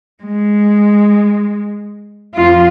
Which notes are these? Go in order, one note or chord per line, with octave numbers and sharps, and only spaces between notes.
G#3
F2 F4